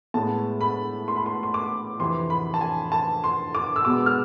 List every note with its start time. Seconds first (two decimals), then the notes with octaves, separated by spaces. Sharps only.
0.14 A2 G#3 B3 A5
0.61 B5
1.08 C6
1.16 B5
1.26 C6
1.43 C6
1.54 D6
2.00 F2 C3 E3 C6
2.30 B5
2.54 A5
2.61 G#5
2.92 A5
3.24 C6
3.55 D6
3.76 E6
3.85 B2 G#3 B3 D6
4.06 F6